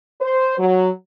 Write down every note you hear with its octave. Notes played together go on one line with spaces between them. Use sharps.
C5
F#3